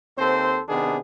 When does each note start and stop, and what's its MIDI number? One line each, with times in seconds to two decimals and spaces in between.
0.18 0.62 39
0.18 0.62 60
0.18 0.62 69
0.18 0.62 72
0.69 0.98 48
0.69 0.98 51
0.69 0.98 59
0.69 0.98 62
0.69 0.98 68